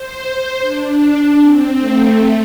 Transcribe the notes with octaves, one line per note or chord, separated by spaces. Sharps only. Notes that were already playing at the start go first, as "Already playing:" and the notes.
Already playing: C5
D4
C4
A3
A3